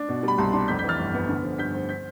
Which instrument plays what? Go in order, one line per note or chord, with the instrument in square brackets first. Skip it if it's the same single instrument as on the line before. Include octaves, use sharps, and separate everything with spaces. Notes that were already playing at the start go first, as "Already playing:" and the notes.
Already playing: [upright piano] D4
B2
G3 B5
C2 A5 C6
D4 A5 C6
F2 G6 B6
G6 B6
E3 F6 A6
G1
B3
D3
F3
G2 G6 B6
C4
G6 B6